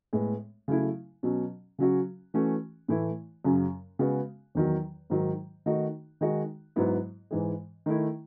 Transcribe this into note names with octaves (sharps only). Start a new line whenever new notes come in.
A2 G#3 B3
C#3 F#3 A3 E4
B2 F#3 C#4
C#3 F#3 C#4 F#4
E3 A3 C#4 F#4
A2 E3 A3 E4
F#2 C#3 F#3 C#4
C#3 G#3 B3 F#4
E2 D#3 F#3
G#2 D#3 F#3
D#3 A3 D#4 F#4
D#3 G#3 D#4 F#4
G#2 F#3 B3 E4
G#2 E3 G#3
D#3 A3 E4